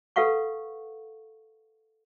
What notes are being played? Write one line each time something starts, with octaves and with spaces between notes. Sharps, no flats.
A4 B4 F5 F#5 C#6